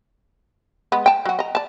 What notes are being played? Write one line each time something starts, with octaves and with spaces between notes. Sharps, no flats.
G#3 B3
G5 A5
F#3 F#4
D#5 A#5
D5 A5